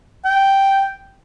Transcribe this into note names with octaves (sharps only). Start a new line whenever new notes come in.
G5